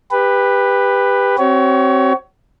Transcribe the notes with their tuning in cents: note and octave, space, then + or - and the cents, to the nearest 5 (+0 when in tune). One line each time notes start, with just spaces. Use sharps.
G4 +25 B4 +0
C4 +15 F#4 +45 C#5 +20